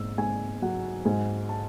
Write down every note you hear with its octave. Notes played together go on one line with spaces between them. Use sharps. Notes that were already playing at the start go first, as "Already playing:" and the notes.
Already playing: G#2 E6
G#2 G#5
F#3 F#5
G#2 G#5
A5